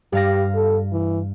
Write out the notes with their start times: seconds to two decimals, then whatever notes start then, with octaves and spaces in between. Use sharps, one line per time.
0.12 G2 G4 F5 A#6
0.55 A4
0.92 E3